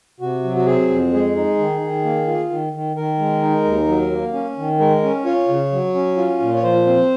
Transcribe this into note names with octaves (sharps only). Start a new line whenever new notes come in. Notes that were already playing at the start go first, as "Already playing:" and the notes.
C3 F#4
F#3
F#4
C4 G#4
F2
G#3 G#4
D#4
D#3
D#3
A#3
F4
D#3
D#3
D#3 A#4
G#3
D#4
D#2
F#3
A#3
C#4
D#3
G#3 A#4
C#4
F4 C#5
C#3
F#3
C#4
F4
A#2
C#5
F3 C5
C4